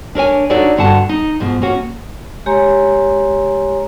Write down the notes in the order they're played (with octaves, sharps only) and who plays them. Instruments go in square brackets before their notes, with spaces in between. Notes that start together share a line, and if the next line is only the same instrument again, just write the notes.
[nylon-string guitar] D4 A#4 C#5 G#5
D4 D#4 F#4 A4 C#5 D5
G2 D3 F#4 F#5 A5
D#4
G#2 B2 F3
A#3 C#4 F#4
[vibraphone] G#3 G4 C#5 G#5 A#5 C6